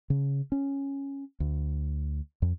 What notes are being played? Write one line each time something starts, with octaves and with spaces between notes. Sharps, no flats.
C#3
C#4
D2
F2